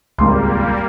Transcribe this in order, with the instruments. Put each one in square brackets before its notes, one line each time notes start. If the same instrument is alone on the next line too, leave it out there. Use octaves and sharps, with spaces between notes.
[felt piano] D#1 G#1 C6 [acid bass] C#2 [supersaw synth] G3 A#3